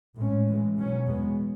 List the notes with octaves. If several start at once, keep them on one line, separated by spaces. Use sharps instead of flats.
A2 G#3 C#4
A2 E3 G#3
B2 F#3 C#4
E2 B2 G#3 B3